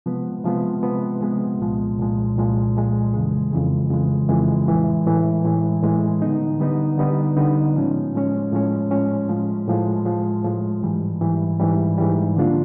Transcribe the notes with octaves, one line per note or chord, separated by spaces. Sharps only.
C3 F3 G#3 B3
C3 F3 G#3 B3
C3 F3 G#3 B3
C3 F3 G#3 B3
C2 A#2 F3 G#3
C2 A#2 F3 G#3
C2 A#2 F3 G#3
C2 A#2 F3 G#3
F2 C#3 E3 G#3
F2 C#3 E3 G#3
F2 C#3 E3 G#3
F2 C#3 E3 G#3
A2 E3 G#3
A2 E3 G#3
A2 E3 G#3
A2 E3 G#3
D3 G3 B3 D#4
D3 G3 B3 D#4
D3 G3 B3 D#4
D3 G3 B3 D#4
A2 F3 G#3 C#4
A2 F3 G#3 C#4
A2 F3 G#3 C#4
A2 F3 G#3 C#4
A2 F3 G#3
A2 F3 G#3
A2 F3 G#3
A2 F3 G#3
G#2 E3 G3
G#2 E3 G3
G#2 E3 G3
G#2 E3 G3
D3 F3 A#3 D4 F4